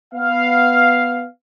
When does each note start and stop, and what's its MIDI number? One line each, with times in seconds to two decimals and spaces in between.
0.14 1.25 59
0.14 1.25 77